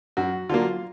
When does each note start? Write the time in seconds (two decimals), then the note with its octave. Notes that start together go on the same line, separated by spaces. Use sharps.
0.17 F#2 F#4
0.49 D3 F#3 A#3 F4